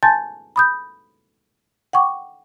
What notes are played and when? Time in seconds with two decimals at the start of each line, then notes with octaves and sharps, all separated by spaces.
0.03 G#5 A5 C6 G6 A6
0.56 B5 D#6 G6
1.93 F#5 G5 C#6 D6